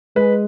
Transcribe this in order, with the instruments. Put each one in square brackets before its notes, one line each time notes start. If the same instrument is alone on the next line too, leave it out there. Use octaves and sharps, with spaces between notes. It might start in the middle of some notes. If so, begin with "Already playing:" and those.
[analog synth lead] G#3 [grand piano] B4